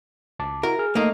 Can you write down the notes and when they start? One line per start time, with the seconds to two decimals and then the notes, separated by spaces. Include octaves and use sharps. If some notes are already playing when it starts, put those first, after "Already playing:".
0.39 C#2 A5 D6
0.63 E4 F#4 A#4
0.79 G#4 F6
0.95 A3 A#3 D#4